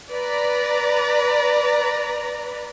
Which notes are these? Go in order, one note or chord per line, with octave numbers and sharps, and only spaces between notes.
B4 D5 A#5